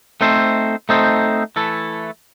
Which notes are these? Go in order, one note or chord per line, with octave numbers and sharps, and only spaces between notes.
A3 C4 D#4 A4 C5
A3 C4 D#4 A4 C5
E3 A3 E4 A4